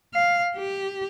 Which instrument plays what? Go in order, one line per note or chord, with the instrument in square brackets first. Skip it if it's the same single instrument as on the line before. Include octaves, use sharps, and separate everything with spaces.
[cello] F5
G4